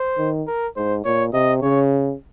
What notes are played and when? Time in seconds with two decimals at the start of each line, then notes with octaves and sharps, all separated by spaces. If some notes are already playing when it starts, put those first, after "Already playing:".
Already playing: C5
0.18 D#3
0.47 A#4
0.76 G#2 C5
1.04 A#2 C#5
1.33 C3 D#5
1.62 C#3 C#5